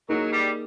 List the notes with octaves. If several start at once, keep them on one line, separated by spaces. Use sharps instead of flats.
F#3 A#3 D#4 G#4
G3